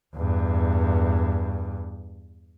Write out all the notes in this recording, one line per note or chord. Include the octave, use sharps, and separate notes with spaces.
E2 G2